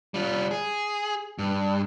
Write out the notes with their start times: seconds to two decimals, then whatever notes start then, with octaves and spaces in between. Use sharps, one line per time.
0.14 G3 F4
0.51 G#4
1.39 G2